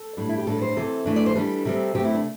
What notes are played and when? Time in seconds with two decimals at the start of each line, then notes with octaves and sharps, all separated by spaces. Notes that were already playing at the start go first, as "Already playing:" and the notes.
Already playing: A4
0.17 A2 G3 D4
0.29 E4
0.38 G4
0.47 A2 G3 D4 A4
0.62 C5
0.76 C3 E3 C4 A4
1.06 E3 A3 D4
1.16 D5
1.26 C5
1.35 E3 G3 D4 A4
1.65 C3 G3 C4
1.95 C3 A3 C4 G4
2.05 E4
2.14 D4